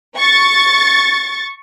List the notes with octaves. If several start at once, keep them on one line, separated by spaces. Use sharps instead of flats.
C#6 A6